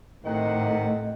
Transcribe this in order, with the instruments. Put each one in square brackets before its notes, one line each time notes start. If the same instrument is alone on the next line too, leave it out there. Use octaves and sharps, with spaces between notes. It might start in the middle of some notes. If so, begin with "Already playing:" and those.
[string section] A2 [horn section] C3 D#3 F#5 [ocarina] D#5